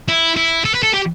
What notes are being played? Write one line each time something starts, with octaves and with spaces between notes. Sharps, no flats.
E4
E4
A4
B4
A4
G4